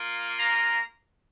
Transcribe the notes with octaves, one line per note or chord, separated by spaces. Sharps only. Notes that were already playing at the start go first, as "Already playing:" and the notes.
Already playing: A#3 F4
A#5